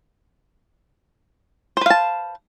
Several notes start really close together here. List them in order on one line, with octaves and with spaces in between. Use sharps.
C5 B4 F5 A5